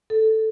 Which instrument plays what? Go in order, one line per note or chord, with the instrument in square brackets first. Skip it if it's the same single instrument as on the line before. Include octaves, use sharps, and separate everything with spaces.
[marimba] A4